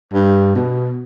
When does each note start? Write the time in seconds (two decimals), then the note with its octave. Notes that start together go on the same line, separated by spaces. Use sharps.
0.14 G2
0.55 B2